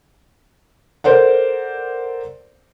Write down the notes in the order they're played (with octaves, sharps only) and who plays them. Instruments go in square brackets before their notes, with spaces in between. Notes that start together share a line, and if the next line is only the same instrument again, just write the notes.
[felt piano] A4 A#4 C5 D5 F#5